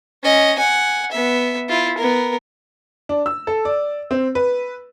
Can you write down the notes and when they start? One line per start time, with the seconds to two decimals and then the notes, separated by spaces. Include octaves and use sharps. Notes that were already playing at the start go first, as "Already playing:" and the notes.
0.24 C#4 D#5
0.59 F#5 G#5
1.11 B3 E5
1.69 E4 F4
1.98 B3 A#4
3.09 D4
3.26 E6
3.47 A4
3.65 D5
4.11 C4
4.35 B4